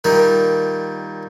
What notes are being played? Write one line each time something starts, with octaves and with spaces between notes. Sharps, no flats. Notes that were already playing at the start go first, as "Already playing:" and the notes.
A#2 D#3 G3